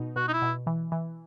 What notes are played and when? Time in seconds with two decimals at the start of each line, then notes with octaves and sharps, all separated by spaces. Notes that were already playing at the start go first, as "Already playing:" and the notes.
Already playing: B2 D#4
0.16 B2 F#4
0.28 D#4
0.33 E4
0.42 B2
0.67 E3
0.92 E3